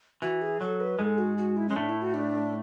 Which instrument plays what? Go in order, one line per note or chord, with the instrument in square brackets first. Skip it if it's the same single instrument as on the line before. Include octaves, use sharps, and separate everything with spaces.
[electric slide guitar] E3 [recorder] F#4
[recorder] G#4
[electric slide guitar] F#3 [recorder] A4
[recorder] B4
[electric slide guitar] G#2 G#3 [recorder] A4
[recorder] F#4
F#4
E4
[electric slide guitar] G#3 [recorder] C#4
[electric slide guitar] A2 A3 [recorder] D4
[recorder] E4
F#4
D4